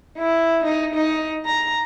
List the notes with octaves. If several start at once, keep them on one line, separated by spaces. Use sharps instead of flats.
E4
D#4
D#4
A#5